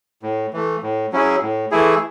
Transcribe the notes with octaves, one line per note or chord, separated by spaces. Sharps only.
A2
E3 A3
A2
F#3 C#4 E4 G#4
A2
E3 A3 E4 G#4